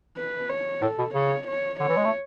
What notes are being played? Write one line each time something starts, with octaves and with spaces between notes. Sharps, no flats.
B4
C#5
A2 A4
B2
C#3 C#5
C#5
D3 C#5
E3
G#3
A3